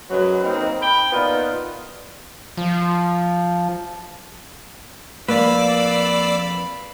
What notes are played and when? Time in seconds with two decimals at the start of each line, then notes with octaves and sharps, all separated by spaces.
0.10 F#2 F#3 G#3 B4
0.44 A#3 C4 D#4
0.81 G5 B5
1.12 A#2 B3 D#4 F4
2.57 F3
5.28 F2 A#3 B4 D5 F5 B5 D6 E6